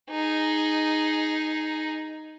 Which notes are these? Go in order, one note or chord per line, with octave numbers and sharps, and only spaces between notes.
D#4 G#4